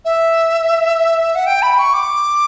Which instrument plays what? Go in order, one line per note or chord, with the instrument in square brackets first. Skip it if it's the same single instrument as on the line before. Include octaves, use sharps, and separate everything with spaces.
[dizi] E5
F#5
G5
B5
C#6
D6